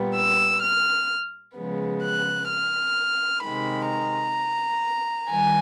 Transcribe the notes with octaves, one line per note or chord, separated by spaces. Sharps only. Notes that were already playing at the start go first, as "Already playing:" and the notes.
Already playing: A#2 G3 B3
E6
F6
C#3 F3 G#3 B3
F#6
F6
C3 D#3 G#3 B5
A#5
D#3 G3 G#5